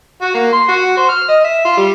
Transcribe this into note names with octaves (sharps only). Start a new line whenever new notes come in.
F#4
A#3
C6
F#4
C5
F6
D#5
E5
F4
G3